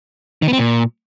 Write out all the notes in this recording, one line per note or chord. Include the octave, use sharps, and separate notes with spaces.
D#3
B3
C4
A#2